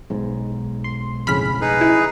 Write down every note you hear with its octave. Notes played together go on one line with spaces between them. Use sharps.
B1 G#2
C6
F2 A2 C#3 B5 F6 B6
D#4 G#4 B4
E4